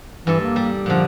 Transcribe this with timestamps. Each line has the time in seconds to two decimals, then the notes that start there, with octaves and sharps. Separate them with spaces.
0.27 G2 E3 A4
0.41 A#3
0.56 G3
0.86 A#2 D3 F3